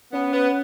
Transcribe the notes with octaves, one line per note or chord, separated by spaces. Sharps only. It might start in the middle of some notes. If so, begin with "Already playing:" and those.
B3 C#4
B3